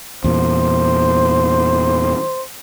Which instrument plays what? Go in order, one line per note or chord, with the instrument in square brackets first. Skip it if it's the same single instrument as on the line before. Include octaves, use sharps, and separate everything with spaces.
[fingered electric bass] E2 A#2 [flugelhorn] C5